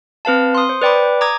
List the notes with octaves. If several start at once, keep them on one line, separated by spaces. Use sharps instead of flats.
C4 B4 F5 A5
C6 D#6
C5
B4 D5 G5 B5 D6
A#5 D6 D#6 G#6